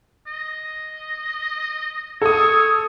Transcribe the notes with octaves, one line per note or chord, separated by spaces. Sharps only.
D#5
A4 C#5 D#6